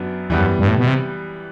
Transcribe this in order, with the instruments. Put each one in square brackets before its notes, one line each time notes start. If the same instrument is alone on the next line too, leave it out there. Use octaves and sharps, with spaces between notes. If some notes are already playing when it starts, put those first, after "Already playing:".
Already playing: [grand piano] F#2 F#3 B3 D4
[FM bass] E2 [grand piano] E3 G3 B3
[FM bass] F#2
G2
A2
B2
C3